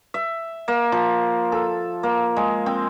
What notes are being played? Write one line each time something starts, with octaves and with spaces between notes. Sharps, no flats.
E5
A#3
F3
A4
A#3
G#3
C4